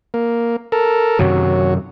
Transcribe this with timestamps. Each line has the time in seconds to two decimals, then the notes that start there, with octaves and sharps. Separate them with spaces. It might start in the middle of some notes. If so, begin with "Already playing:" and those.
0.14 A#3
0.72 A4 A#4
1.19 F#2 C3 D#3 F#3